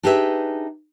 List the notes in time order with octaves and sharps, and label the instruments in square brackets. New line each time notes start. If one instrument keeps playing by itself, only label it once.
[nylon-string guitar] D4 D#4 G4 G#4 B4 E5